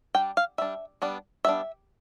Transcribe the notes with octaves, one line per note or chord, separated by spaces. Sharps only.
G3 D4 G5
F5
G3 D4 E5
G3 B3 D4
G3 B3 D4 E5